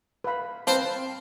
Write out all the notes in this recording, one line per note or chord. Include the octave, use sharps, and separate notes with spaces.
B4 F5 B5
C4 B4 C5 F5 A5